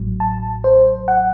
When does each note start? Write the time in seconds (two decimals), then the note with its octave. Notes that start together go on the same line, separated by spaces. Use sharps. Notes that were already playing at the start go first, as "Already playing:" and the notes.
Already playing: A1 A2 F#3
0.20 A5
0.64 C5
1.08 F#5